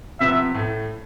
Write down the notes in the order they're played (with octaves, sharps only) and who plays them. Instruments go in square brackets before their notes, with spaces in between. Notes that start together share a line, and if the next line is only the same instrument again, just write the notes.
[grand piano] C3 F3 B3 [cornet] E5
[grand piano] A2 A3